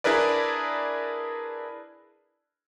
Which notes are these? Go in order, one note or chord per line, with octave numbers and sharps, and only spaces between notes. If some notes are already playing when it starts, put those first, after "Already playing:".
D4 E4 G#4 A#4 B4 D5